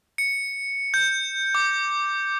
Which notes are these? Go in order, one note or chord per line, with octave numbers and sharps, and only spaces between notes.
C#7
G6
D6